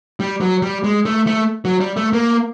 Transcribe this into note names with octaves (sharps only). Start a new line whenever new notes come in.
G3
F#3
G3
G#3
A3
A3
F#3
G3
A3
A#3